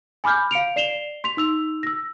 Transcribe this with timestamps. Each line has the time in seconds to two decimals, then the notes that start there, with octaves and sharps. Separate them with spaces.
0.24 G#5 B5 D6 F6 G6
0.51 F5 C#7 D7 F7
0.76 D5 C7 E7 F7 G7
1.24 C6 B6 F7
1.37 D#4 E6 F7
1.83 E6 A#6